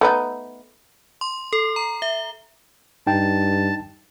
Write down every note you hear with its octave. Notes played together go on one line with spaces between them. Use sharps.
A3 B3 D#4
C6
A4
A#5
E5
G2 D#4 G5 A5